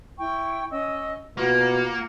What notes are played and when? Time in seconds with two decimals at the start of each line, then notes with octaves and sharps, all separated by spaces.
0.18 E4 G5 C#6
0.71 C#4 D#5 E6
1.37 B2 A#3 F4 F#5